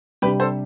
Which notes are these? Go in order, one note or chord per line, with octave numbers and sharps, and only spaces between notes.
C3 G3 D4 G4 B4
A4 C5